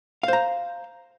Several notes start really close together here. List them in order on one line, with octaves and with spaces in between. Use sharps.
F5 C5 A#5